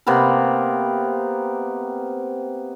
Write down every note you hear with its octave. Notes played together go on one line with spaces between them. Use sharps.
C3 A#3 B3 A#4